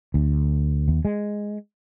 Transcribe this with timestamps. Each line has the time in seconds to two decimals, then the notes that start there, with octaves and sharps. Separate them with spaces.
0.14 D2
0.88 D#2
1.05 G#3